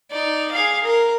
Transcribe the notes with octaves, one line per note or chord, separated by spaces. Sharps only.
D#4 D5
G#4 F5
A#4